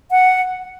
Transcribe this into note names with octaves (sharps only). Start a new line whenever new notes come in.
F#5